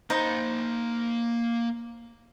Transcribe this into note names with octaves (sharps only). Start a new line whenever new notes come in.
A#3 D#4 C5 B5